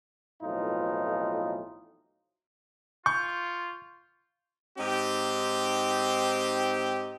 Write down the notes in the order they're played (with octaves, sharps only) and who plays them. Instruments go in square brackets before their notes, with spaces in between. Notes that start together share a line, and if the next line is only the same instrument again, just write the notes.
[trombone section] B1 F2 A2 E3 D#4 F4
[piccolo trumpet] F4 [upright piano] C#6 [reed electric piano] G6
[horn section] G#2 C4 D#4 G4